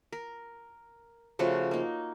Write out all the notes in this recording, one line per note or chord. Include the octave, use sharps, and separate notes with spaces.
A#4
C#3 F3 A3 F#4
A#3 D#4